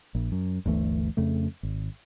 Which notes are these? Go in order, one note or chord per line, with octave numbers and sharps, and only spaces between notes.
A#1
F#2
G1 D2 E3 A3
F2 C#3 A3
G#1